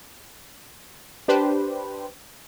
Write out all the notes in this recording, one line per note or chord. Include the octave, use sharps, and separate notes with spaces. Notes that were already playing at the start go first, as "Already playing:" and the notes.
D4 G4 B4 C5